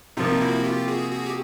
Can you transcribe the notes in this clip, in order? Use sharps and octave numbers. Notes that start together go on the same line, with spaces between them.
C3 F3 A#3 D#4 F4
E4 F#4
F4 G4
F#4 G#4
F#4 G#4
G4